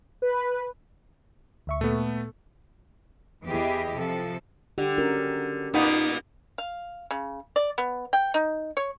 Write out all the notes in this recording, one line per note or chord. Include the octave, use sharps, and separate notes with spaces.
B4
D2 E5 C#6
A#2 A3 B3 A4
E2 E3 E4 G4 G#4 D#5
C3 F3 A4
D3 G4
C#4 F#4 A#4
A#2 A#3 B3 D#4
F5
C#3
D5
B3
G5
D#4
C#5